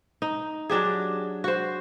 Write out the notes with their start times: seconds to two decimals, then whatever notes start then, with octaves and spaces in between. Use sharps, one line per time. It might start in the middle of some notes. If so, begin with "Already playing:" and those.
0.22 D#4
0.70 F#3 D4 G4 G#4
1.44 F#4 C5